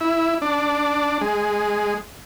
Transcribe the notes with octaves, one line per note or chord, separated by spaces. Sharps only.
E4
D4
G#3